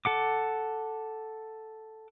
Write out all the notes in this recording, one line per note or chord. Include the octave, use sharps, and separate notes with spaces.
A4 F#5 D6